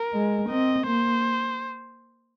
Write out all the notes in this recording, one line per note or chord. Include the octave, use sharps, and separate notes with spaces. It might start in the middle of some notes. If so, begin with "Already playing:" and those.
Already playing: A#4
G#3
C4 D#5
A#3 C5